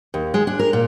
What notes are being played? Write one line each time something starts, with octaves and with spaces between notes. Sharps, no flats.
D#2
G#3
D4
A#4
A#2